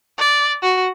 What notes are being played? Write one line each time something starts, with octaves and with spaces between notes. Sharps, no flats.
D5
F#4